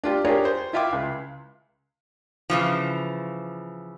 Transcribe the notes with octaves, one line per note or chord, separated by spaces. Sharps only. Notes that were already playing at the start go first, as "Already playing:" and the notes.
D4 F4 G4
D4 F4 G4 G#4 A#4 C#5
C5
E4 F4 E5 F5 G5 D6
C#2
C#3 E3 F3